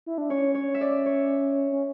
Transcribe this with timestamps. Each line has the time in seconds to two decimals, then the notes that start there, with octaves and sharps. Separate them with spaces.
0.06 E4
0.18 D4
0.29 C#4 C#5
0.54 C#5
0.74 E5
0.81 D5
1.06 C#5
1.72 C#4